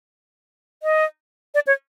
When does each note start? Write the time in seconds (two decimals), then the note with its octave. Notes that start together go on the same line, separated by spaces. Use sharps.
0.83 D#5
1.54 D5
1.67 C#5